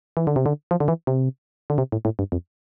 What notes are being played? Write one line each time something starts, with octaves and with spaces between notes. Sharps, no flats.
E3
D3
C3
D3
F3
D3
E3
C3
D3
C3
A2
A2
G2
F2